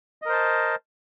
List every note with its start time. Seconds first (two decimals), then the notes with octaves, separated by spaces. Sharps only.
0.22 D#5
0.25 A#4
0.29 C5
0.33 A5